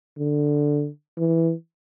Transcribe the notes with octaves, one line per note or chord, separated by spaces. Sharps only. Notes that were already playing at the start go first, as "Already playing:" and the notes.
D3
E3